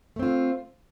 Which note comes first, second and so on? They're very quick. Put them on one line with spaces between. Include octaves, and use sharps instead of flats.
A3 C4 F4